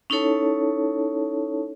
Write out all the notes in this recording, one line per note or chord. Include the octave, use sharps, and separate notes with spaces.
C#4 D#4 E4 A4 C#5 A5